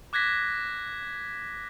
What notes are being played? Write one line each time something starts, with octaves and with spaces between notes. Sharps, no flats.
D6 F#6 G#6 A#6 B6